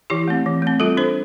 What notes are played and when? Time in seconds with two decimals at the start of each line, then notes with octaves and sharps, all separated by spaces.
0.10 E3 E4 G4
0.28 A3 C4
0.46 E3
0.62 A3 C4
0.80 G3 F4 A4
0.97 D4 A4 C5